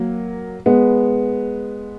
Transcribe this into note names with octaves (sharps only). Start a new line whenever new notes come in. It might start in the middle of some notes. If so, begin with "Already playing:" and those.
Already playing: F#3 A#3
G#3 B3